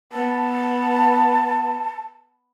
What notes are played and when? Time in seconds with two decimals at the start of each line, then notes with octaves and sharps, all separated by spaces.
0.13 B3 A5